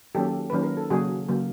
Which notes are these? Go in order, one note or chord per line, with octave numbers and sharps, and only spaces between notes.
D#3 F#3 A#3 C#4 G4 A4
D#3 F#3 A#3 C#4 B4
A#4
A4
C#3 F#3 A#3 F#4 G#4
C#3 F#3 A#3